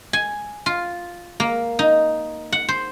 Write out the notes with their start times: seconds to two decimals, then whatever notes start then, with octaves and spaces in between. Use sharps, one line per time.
0.13 G#5
0.66 F4
1.40 A#3
1.79 D#4
2.52 F#5
2.69 C5